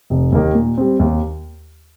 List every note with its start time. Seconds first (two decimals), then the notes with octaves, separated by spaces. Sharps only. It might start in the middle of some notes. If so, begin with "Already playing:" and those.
0.10 F1
0.32 D#2 D#3 A#3 G4
0.55 A#2
0.77 G3 C4
0.99 D#2